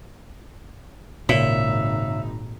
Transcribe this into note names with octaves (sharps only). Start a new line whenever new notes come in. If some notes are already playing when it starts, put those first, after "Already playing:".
G#1 A#2 C#3 D#4 E5